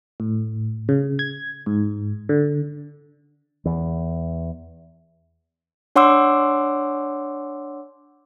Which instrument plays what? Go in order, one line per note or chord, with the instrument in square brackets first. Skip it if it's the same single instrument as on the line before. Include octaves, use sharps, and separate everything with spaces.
[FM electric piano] A2
C#3
G#6
G#2
D3
[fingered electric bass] E2
[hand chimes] D4 C#5 F#5 C6 D6 E6